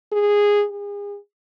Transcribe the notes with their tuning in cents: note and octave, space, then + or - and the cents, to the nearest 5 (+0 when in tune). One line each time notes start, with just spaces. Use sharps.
G#4 -10
G#4 -35